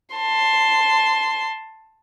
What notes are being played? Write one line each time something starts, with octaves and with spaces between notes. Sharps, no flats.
A5 C6